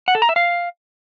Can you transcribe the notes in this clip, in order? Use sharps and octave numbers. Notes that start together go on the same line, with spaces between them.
F#5
A4
A#5
E5
F5